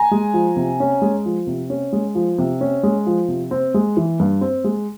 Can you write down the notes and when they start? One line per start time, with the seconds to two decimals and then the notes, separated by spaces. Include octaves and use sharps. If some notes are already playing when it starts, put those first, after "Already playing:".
Already playing: G#5 A#5
0.11 G#3
0.34 F3
0.56 C3
0.80 C#4
1.02 G#3
1.25 F3
1.47 C3
1.70 C#4
1.93 G#3
2.15 F3
2.38 C3
2.61 C#4
2.83 G#3
3.06 F3
3.28 C3
3.51 C4
3.74 G#3
3.97 E3
4.20 G2
4.41 C4
4.64 G#3